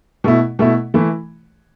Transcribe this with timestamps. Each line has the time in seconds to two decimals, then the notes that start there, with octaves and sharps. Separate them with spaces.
0.24 B2 A3 E4
0.59 B2 A3 E4
0.94 E3 A3 E4